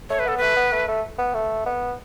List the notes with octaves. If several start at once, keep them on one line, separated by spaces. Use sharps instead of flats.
A3 C#5
B4
B3 A4
A3 B4
B3
A3
A3
B3
A3
B3